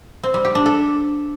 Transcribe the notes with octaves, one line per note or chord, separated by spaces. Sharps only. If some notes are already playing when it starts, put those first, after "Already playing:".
C4
G3
G4
D4
A4